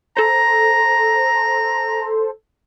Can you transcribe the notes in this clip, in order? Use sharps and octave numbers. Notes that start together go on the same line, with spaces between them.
A4 C5 A#5